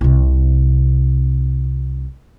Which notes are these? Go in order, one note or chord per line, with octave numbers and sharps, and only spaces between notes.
C2 C3